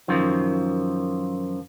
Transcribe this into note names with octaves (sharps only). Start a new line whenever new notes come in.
F#2 D#3 F3